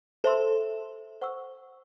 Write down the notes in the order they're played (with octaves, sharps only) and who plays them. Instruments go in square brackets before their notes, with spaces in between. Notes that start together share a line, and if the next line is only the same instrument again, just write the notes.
[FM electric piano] A4 [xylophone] C5 E5 C6 E6
[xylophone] C5 F#5 C#6 E6